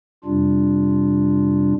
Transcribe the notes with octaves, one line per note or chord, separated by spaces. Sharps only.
F2 C3 G3 D4 F4